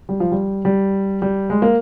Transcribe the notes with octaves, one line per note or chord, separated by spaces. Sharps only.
G3
F3
G3
G3
G3
G#3
A#3